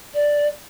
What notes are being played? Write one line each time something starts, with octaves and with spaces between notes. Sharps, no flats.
D5